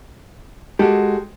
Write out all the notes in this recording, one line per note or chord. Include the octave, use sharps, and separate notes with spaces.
G#3 F#4 G4 A4